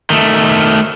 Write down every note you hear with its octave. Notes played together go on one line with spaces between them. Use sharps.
D#3 A3